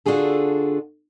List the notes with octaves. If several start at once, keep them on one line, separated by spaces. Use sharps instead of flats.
D3 D4 F4 F#4 G#4 A4